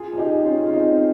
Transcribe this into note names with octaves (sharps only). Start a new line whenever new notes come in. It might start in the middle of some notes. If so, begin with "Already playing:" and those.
Already playing: F4 G#4
G#4
D#4 G4
C#4 F4
F4
C4 D#4